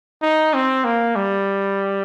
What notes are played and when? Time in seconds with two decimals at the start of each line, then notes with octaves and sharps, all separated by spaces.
0.22 D#4
0.54 C4
0.85 A#3
1.16 G3